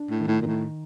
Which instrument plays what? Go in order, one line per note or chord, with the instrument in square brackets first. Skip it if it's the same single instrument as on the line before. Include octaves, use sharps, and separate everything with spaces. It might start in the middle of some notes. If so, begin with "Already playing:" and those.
Already playing: [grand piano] D4
[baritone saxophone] A2
[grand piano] D#3
[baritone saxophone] A2
A#2
[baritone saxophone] A2 [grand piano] D#3